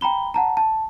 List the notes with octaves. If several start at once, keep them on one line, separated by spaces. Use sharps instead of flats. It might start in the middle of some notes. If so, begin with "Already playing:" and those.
G5 A#5 B5 G7
F#5 A5 A#5
A5